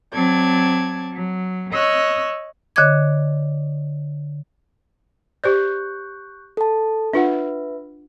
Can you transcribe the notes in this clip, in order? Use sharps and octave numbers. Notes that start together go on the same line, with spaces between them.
F#3 C4 D5 A5 G#6
F#3
C#5 D#5 C#6 E6 F#6
D3 C#5 D#5 D6 G#6
G4 C5 D5 C#6 F#6 G6
A4 A5
D4 F4 B4 E5 F#5